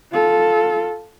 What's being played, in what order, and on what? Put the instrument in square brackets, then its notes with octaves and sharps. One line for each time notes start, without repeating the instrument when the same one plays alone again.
[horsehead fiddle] F4 A4